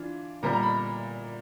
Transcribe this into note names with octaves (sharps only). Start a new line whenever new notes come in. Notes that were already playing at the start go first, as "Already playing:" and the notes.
Already playing: E3 D4 F4
A#2 G3 B3 A#5
A#5
B5